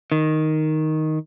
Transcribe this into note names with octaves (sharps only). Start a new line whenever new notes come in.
D#3